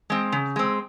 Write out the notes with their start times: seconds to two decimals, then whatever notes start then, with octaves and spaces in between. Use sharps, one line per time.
0.10 G#3 C4
0.32 C#3
0.56 G#3 C4